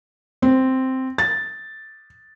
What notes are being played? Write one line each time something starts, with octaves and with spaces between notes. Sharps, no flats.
C4
A6